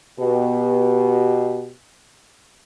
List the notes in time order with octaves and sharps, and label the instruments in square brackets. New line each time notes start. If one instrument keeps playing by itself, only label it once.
[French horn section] B2 G4